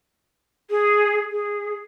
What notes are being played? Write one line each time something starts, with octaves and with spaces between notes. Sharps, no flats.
G#4
G#4